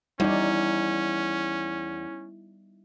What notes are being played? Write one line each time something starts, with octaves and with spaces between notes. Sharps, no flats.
E2 G3 C#4 D#4 D5